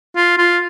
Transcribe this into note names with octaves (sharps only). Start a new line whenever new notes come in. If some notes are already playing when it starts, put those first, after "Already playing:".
F4
F4